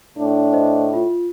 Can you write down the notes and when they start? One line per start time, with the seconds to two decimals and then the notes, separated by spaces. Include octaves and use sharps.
0.18 A2 D4
0.53 C5 D#5
0.94 F4